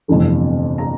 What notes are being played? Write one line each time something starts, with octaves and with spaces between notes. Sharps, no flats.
G1 F2 C3 E3 A3
A#5